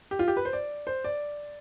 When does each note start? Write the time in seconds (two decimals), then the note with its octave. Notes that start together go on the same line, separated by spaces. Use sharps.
0.11 G4
0.19 F4
0.28 G4
0.37 B4
0.45 C5
0.53 D5
0.87 C5
1.04 D5